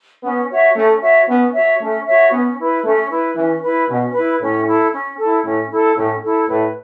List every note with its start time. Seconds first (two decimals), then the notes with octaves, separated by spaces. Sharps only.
0.22 B3 C#4
0.49 F#4 C#5 E5
0.75 A3 C#4
1.01 F#4 C#5 E5
1.27 B3 C#4
1.53 F#4 C#5 E5
1.79 A3 C#4
2.05 F#4 C#5 E5
2.32 B3 C#4
2.57 E4 B4
2.84 A3 C#4
3.09 E4 B4
3.35 E3 C#4
3.62 E4 B4
3.88 B2 C#4
4.13 E4 B4
4.40 A2 C#4
4.66 E4 A4
4.92 C#4
5.18 E4 A4
5.44 A2 C#4
5.70 E4 A4
5.96 A2 C#4
6.23 E4 A4
6.48 A2 B4